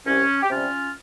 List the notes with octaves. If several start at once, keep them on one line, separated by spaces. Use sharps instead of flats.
C2 C#4
G4
C3 G3 C#4 F4